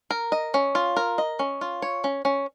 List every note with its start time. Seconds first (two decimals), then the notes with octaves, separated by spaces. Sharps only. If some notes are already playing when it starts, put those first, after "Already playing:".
0.11 A#4
0.32 D#5
0.54 C#4
0.75 F4
0.97 A#4
1.18 D#5
1.39 C#4
1.61 F4
1.82 C#5
2.04 C#4
2.25 C#4